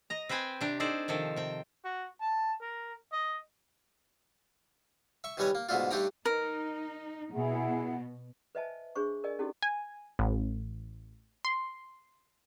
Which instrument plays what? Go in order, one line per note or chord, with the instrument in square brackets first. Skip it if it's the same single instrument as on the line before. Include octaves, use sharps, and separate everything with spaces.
[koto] D#5 A#5
C4 B4 C5 G5 G#5
C3 D4 G4
D4 D#4 G#4 A4 C5 D5
C3 D#3 F3 A4
C3 G5
[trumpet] F#4
A5
A#4
D#5
[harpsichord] E5 C#6
D#3 E3 G3 B4 C#5 D#5
A#3
G#2 B2 D3 A3 D4 F4
G2 A3 D4 D#4 G5 A#5
[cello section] D#4 [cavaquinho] A#4
[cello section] B2 [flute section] E4 G#4 F#5
[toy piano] B4 C5 D#5 E5 G#5 A5
D4 G#4 C5 C#6
A#4 D5 D#5 G#5
C#4 D#4 E4 F#4 G4 A4
[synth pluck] G#5
A1
C6